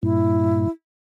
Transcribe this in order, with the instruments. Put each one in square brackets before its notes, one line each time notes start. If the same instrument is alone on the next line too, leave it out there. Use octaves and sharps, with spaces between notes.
[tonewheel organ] G2 A#2 [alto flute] E4